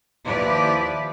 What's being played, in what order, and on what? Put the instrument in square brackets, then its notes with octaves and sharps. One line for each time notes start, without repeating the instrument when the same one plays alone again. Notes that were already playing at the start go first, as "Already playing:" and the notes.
[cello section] D#2 F3 E4 G4 B4 D5